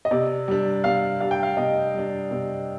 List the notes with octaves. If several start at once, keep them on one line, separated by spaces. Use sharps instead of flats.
D#5
C3 D5
G3 D4
C3 F5
G3 D4 F5
G5
F5
C3 D#5
G3 D4
C3